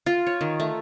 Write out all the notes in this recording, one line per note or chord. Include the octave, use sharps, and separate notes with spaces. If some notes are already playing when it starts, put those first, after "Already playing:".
F4
C#5
D#3
A3